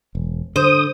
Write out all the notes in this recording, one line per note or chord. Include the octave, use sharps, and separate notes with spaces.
E1
D3 C5 D#6